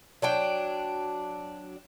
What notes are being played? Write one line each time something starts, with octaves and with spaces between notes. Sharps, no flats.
F#3 D4 G5